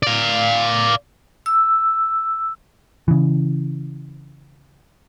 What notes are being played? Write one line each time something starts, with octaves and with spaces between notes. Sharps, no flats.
D5 F5
E6
C#3 E3